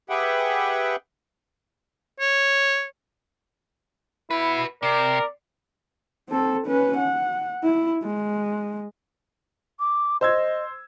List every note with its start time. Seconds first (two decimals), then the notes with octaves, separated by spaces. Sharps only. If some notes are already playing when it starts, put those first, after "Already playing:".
0.09 G4 G#4 B4 E5 F#5 G5
2.20 C#5
4.31 E4 F#4 B4
4.83 C3 A#4 D5
6.29 C4 A4
6.67 C#4 B4
6.98 F#5
7.64 E4
8.03 G#3
9.80 D6
10.21 C5 D#5 E6 G#6